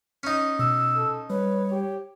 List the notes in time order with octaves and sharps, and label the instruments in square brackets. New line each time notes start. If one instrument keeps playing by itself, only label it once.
[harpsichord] C#4 D#4
[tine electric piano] B2 [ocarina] E6
[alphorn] A4
[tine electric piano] G3 [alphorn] B4 [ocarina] C#5
[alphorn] G4